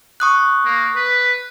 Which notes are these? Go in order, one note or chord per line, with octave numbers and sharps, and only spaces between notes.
C#6 D#6 F#6
A#3
B4